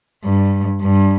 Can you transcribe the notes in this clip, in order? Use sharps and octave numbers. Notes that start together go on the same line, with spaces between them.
G2
G2